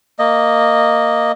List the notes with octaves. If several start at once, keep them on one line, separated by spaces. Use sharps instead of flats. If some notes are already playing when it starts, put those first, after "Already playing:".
A#3 D#5